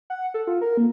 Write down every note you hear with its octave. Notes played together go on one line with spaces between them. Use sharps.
F#5
A4
F4
A#4
A#3